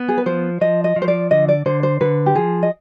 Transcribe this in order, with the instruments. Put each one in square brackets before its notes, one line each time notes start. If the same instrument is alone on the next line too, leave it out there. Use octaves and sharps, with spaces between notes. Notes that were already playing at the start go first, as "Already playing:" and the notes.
Already playing: [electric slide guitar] B3
[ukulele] G#4
B4
[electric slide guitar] F3 [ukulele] C5
[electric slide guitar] F3 [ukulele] D#5
[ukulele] D#5
[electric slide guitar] F3
[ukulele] C5
D5
[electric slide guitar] D3 [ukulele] D#5
[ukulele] D5
[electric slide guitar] D3 [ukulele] C5
[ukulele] C5
[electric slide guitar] D3 [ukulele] B4
[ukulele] G4
[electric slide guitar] F3 [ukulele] G#4
[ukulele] D#5